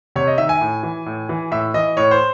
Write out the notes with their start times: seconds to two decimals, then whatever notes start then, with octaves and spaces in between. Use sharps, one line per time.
0.16 C3 C#5
0.27 D#5
0.38 D#3 E5
0.49 G#5
0.61 A2
0.83 E3
1.06 A2
1.29 E3
1.51 A2 E5
1.74 E3 D#5
1.97 A2 C#5
2.11 C5